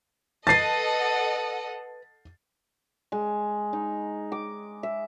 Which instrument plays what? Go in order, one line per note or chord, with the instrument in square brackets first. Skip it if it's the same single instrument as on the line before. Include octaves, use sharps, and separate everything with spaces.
[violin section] A4 D#5 F#5 [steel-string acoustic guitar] B4 A5 [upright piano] A6 C7
[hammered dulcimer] G#3
D#4
D6
E5